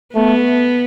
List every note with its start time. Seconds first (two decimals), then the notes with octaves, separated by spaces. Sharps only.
0.14 A3 B3